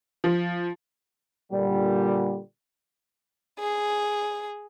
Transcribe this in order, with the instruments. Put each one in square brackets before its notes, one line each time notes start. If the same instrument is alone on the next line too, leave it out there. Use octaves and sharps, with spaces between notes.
[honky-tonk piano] F3
[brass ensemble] A#2 D3 G3
[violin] G#4